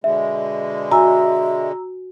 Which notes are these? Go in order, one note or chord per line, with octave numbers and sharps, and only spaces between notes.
B2 D3 G#3 E5
F#4 E5 G#5 A#5 E6